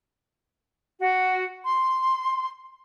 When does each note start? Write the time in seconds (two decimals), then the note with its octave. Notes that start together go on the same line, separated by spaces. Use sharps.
0.99 F#4
1.64 C6